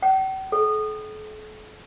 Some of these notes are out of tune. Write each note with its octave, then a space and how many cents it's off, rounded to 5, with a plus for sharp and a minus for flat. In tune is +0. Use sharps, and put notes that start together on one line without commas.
G5 -45
A4 -45